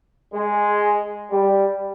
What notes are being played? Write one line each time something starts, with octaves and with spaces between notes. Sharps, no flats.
G#3
G3